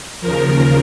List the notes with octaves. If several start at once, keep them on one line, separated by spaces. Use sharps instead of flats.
D#2 C#3 F3 A#4